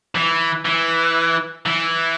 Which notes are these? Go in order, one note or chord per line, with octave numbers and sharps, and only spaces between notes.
E3
E3
E3